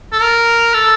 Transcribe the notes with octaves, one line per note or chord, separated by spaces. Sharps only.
A4
A#4
A4